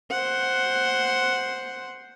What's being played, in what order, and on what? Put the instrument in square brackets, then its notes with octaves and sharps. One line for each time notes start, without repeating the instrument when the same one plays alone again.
[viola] C5 F#5